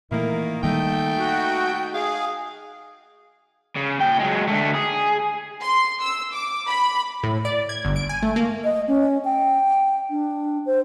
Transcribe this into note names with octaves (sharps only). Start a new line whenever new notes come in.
A#2 D#3 E3 A3 A#3 E4
D#3 G3 A3 A#3 D#4 G5
F#4
G#4 F5
C#3
A#2 G5
F#3 G#3
D3 A3
G#4
C6
E6
D6
B5
A2
D5
G#6
G1
D7
G#5
A3
A#3
D#5
C#4
G5
D4
C5